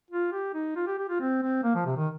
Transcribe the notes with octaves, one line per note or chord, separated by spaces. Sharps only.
F4
G4
D#4
F4
G4
G4
F4
C4
C4
A#3
F3
C3
D#3